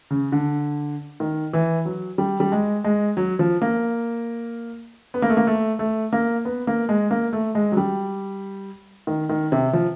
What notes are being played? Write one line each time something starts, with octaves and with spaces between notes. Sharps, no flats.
C#3
D3
D#3
E3
F#3
G3
G3
G#3
G#3
F#3
F3
A#3
B3
A#3
A3
A#3
A3
A3
A#3
B3
A#3
G#3
A#3
A3
G#3
F#3
G3
D#3
D#3
C3
F3